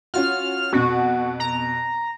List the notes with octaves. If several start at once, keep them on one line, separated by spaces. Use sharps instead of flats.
C#4 F4 F#4 F6
F2 B2 F#4
A#5